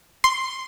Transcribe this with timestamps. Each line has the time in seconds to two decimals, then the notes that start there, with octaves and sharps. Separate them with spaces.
0.24 C6